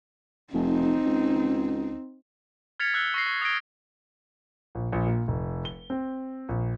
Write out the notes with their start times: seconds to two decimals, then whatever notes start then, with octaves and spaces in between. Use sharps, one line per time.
0.54 F1 C4 D#4
1.06 C#2
2.80 F6 G#6 A6 B6 C#7 F7
2.94 E6 F#6 C7 G7
3.14 C#6 A#6 C7
3.26 C#6
3.41 D#6 G#6 A#6 C7 D7 G7
4.75 A#1
4.92 A#1
5.07 A#2
5.28 F1
5.65 G7
5.90 C4
6.49 A#1